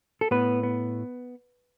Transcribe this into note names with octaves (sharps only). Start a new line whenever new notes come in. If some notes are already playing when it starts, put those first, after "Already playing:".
A4
A2 B3 B4
B3